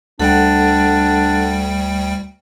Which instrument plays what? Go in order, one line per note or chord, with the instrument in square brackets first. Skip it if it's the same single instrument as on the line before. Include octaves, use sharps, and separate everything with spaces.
[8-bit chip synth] D2 G3 G5 [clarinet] D4 [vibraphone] A4 F#5